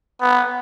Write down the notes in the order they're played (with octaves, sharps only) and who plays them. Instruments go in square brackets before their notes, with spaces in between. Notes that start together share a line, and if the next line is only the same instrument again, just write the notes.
[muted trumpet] B3